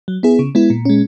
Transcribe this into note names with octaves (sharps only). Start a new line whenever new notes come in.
F#3
B3 E4 G#4
C#3
G#3 B3 E4
A#2
G#3 C#4